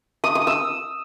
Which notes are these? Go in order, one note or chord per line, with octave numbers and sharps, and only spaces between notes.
D#6
D#6
E6